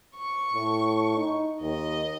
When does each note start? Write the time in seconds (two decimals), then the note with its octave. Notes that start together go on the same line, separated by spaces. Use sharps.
0.16 C#6
0.53 A2
1.17 D#4
1.62 D#2 D#5